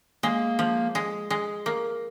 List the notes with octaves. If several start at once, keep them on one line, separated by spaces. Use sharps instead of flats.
G#3 A#3
F3
G#3
G#3
A#3